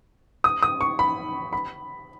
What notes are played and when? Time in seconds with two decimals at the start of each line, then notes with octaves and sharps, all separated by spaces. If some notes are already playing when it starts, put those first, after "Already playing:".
0.44 D#6
0.63 D#6
0.81 C#6
0.99 B5
1.53 B5